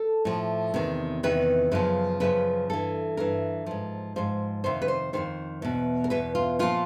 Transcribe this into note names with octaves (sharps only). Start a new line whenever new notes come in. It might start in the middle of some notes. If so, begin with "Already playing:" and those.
Already playing: A4
A2 F3
E2 C3 D#3
E2 C3 D#3 B4
F#2 C#3 F3 B4
F#2 C#3 F3 B4
G2 E3 A4
G2 E3 A#4
G#2 F3
G#2 F3 C5
F2 C3 D#3 C5
B4
C5
F2 C3 D#3 C5
E2 B2
A#4
E2 B2 B4
F4
A#2 F3 F4